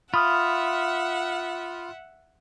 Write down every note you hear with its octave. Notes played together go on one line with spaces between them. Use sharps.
F4 E5 F#5 B5 D#6 F6